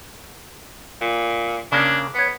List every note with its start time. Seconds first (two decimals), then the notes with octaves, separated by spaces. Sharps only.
1.01 A#2
1.72 C#3 A#3 C#4 D4
2.15 B3 B4 C#5